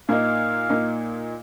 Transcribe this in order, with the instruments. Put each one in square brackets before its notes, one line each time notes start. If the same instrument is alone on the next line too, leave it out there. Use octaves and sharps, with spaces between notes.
[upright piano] A#2 A#3 D#4 [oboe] F5
[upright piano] A#2 A#3 D#4